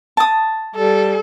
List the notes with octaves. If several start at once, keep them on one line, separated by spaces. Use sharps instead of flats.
A5 D#6
G3 A4